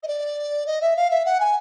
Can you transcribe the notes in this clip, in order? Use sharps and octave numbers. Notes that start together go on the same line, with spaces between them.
D#5
D5
D#5
E5
F5
E5
F#5
G#5